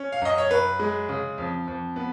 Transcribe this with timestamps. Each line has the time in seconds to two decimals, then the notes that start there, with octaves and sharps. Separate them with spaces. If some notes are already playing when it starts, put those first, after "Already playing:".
Already playing: C#4
0.12 F5
0.21 F#2 D#5
0.38 C#5
0.50 F#2 B4
0.79 G#3
1.09 C#3
1.38 F2
1.67 F2
1.96 B3